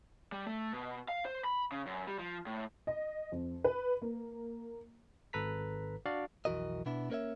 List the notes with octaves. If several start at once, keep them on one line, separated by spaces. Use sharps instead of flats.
G3
A3
B2
F5
C5
B5
C#3
F#2
G3
F3
A2
D#5
F2
B4
A#3
G#1 A4 B4 A#5 B6
D4 F#4 D5 F5
B1 F2 E3 F#4 A#4 D#5
B2 B3 D4 E4
A#3 C#4 A#4 C5 C#5 E5